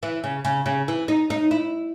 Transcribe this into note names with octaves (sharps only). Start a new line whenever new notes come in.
E3
C#3
C#3
C#3
E3
D#4
D#4
E4